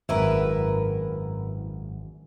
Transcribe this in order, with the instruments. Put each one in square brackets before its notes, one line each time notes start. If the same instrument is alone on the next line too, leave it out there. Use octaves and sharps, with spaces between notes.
[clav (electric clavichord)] G#1 F#2 [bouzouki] E4 A#4 B4